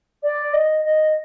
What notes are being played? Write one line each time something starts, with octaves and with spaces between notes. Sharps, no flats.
D5
D#5
D#5